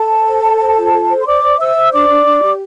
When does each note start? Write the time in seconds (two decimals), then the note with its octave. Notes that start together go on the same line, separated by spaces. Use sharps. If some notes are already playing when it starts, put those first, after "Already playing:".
Already playing: A4 A5
0.10 C5
0.27 C5
0.43 C5
0.60 C5
0.76 F4
0.93 A4
1.09 C5
1.21 C6
1.26 C5 D5 D6
1.43 C5
1.59 C5 E5 E6
1.76 C5
1.92 D4 D5 D6
2.08 D4
2.26 D4
2.42 G4